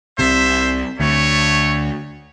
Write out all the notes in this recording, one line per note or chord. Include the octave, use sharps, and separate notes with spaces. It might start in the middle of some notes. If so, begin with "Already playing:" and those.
C2 C3 C5 E5
D2 A3 C#5